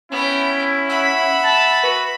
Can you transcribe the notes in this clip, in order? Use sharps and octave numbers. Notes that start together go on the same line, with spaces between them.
B3 C#4 E4 G5
E5 F#5 B5
A5
F#4 B4